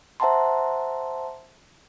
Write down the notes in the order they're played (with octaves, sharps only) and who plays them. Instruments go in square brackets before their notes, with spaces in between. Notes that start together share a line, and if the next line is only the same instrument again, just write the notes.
[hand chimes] C5 E5 F#5 A5 A#5 C6